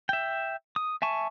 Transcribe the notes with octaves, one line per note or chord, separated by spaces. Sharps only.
E5 G5
D#6
E5 G#5 A5 C#6